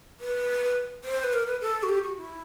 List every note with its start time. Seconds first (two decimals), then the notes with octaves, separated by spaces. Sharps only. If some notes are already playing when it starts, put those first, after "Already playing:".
0.20 B4
1.04 C5
1.24 B4
1.33 A#4
1.47 B4
1.61 A4
1.83 F#4
1.89 G4
2.03 F#4
2.17 E4